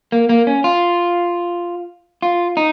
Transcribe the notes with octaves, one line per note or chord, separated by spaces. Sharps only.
A#3
A#3
C#4
F4
F4
D#4